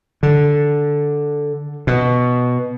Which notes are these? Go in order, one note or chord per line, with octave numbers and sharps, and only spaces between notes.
D3
B2